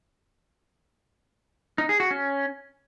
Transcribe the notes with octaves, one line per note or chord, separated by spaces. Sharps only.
D#4
G#4
F#4
C#4